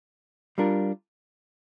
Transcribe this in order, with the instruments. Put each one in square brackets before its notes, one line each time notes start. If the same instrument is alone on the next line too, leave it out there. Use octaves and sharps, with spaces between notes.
[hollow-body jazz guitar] G3 D4 F4 A#4